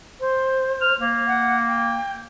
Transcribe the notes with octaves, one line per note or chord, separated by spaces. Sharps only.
C5
F6
A#3
F#5
G5